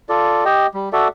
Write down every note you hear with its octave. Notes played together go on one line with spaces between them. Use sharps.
F4 A4 D5
G4 D#5 G5
G3
F#4 A4 D5 E5